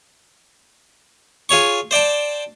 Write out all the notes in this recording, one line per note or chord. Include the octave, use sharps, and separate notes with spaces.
F4 G#4 C#5 C#6
C5 D5 G5 A5